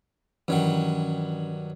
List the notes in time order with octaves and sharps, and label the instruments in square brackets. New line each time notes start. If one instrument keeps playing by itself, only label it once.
[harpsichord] G2 D#3 F#3 [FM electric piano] E3 C#4